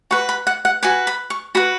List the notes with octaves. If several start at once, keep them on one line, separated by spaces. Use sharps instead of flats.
F#4 B4 C#6
B5
F#5
F#5
F#4 B4 G#5
B5
C#6
F#4 B4 B5